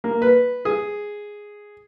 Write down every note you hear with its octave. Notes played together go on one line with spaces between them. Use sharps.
A#3
B4
G#4